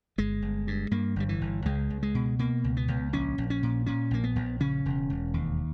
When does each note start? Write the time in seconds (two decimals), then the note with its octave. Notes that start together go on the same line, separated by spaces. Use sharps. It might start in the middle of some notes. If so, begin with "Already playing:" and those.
0.18 G1 G#3
0.42 G1
0.67 G2
0.91 G2 A#3
1.16 G1 G3
1.29 E3
1.41 G1
1.66 C#2 G#3
1.90 C#2
2.03 G#3
2.15 B2
2.39 B2 A#3
2.64 C#2
2.77 B3
2.88 C#2
3.13 A#1 C#4
3.38 A#1
3.50 C#4
3.63 A#2
3.86 A#2 C#4
4.11 A#1 A#3
4.24 B3
4.36 A#1
4.60 C#3 C#4
4.85 E1
5.10 E1
5.34 D#2